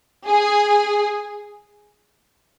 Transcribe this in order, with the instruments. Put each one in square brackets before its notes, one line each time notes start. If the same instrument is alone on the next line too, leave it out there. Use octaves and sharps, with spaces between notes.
[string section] G#4